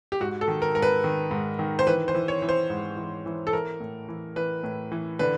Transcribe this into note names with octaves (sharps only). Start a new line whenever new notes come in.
G4
G#2 F#4
A4
D#3
A#4
G#2 A#4
B4
D#3
G#2
D#3
C5
E3 B4
C5
E3
C#5
E3
C5
G#2
E3
E3
A4
E3 A#4
A2
E3
E3 B4
A2
E3
D3 B4